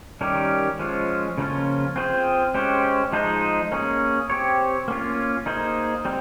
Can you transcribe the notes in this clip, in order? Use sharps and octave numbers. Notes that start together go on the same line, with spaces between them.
D#3 G3 C#4 G4 A#4
F3 G#3 C#4 F4
C#3 F3 A#3 C#4 F4
C4 F4 G#4 C5
G#3 C#4 G4 C5
F3 G#3 D#4 G#4 C5
A#3 C#4 G#4
C4 G4 C#5
A#3 C#4 F4
A#3 D#4 G#4 C5
G3 C4